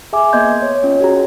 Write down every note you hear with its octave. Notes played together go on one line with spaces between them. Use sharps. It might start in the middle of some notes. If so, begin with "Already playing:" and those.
G#4 E5 G#5 D6
A#3 B3 D#5 C6 G6 G#6
C#5
C#4 F4 C#5
F#4 G#4 A#5